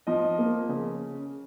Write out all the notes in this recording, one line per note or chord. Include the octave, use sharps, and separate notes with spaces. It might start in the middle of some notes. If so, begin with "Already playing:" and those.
F3 D#5
A#3
C#3